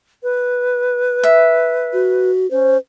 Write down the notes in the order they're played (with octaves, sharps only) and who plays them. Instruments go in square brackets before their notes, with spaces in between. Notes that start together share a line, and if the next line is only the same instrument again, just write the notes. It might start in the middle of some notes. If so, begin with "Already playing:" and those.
[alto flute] B4
[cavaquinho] E5
[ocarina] F#4
[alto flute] C#4 [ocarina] C5